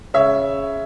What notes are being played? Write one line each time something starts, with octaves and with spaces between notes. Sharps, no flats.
C#3 C#5 E5